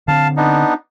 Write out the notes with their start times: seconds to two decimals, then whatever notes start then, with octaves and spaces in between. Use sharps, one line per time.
0.08 D3 C4 F5 A5
0.37 B3 D4 D#4